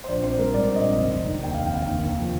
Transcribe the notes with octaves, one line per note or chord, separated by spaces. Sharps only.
C5
A#1 D5
C4 C5
G3 A#4
G#2 D5
A#1
D#5
C4
F1
F1
D#3
D#2 G5
F5
F1
G5
F1 F5
D#2
D#2
F3